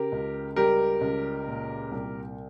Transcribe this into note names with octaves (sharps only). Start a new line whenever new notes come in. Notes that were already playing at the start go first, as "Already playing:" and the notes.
Already playing: C#3 G4 A#4
C#2
G3 G4 A#4
C#2
A#2
C2